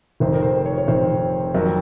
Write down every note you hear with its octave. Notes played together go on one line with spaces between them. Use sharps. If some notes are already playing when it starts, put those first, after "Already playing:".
F1 F2 D#3 C5
A#4
C5
C5
C#5
C#5
F1 F2 D#3 C5
F2 D#3 F#3 A#4